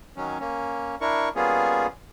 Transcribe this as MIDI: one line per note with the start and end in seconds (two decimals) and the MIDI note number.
0.16 0.38 51
0.16 0.38 54
0.16 0.38 61
0.40 0.96 58
0.40 0.96 61
1.01 1.29 62
1.01 1.29 64
1.01 1.29 70
1.01 1.29 85
1.36 1.87 55
1.36 1.87 58
1.36 1.87 59
1.36 1.87 61
1.36 1.87 65
1.36 1.87 68